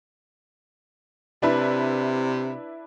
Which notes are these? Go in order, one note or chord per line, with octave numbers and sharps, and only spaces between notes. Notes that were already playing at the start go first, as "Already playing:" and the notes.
C3 D4 E4 B4